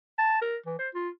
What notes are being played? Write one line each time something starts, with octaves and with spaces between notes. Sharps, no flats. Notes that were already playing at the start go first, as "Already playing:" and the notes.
A5
A#4
E3
C5
F4